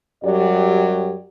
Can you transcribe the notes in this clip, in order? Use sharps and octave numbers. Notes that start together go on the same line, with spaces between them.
F#2 F#3 G3 G4 D5